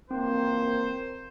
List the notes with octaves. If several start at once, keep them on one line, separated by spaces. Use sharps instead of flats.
F2 E3 A#3 C4 C5